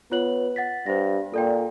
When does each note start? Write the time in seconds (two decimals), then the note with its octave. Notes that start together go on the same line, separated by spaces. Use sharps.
0.12 B3 F4 C#5 F#7
0.56 F#5 A6 B6
0.86 G2 C5 A#6
1.34 A#2 A4 D5 G5